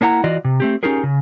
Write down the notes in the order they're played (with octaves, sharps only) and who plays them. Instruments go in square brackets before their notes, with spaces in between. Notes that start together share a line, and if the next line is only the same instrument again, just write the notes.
[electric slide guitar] A#3 D4 E4 F#5 A#5
E3 F4 F#4 D5 D#5
C3
A3 C4 G4
C#4 D#4 F4 G4 G#4 A#4
C#3